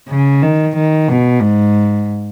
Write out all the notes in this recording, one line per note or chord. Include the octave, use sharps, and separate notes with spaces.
C#3
D#3
D#3
B2
G#2